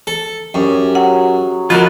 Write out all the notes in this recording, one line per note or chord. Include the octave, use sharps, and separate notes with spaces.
A4
F#2 C#4 G4 G#4
F#3 F#5
F3 G#3 F4 F#4 A#4 B4